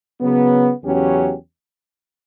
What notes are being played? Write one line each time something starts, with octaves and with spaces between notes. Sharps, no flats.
C#3 F#3 B3
E2 C#3 F#3 C#4 G4